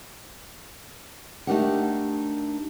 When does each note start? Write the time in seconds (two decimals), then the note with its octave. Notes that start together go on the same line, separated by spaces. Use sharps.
1.47 A3 D4 D#4 G4 A#4 F#5